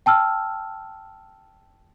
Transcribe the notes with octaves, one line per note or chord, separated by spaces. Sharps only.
G5 A5 E6 F6